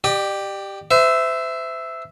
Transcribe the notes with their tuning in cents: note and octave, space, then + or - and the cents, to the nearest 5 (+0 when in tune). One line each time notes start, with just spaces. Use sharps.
G4 +0 D5 +40
C5 -35 E5 +0